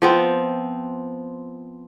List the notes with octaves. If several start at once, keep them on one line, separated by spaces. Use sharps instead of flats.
F3 B3 C4